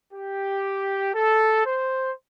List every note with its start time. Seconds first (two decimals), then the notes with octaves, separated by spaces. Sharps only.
0.13 G4
1.14 A4
1.65 C5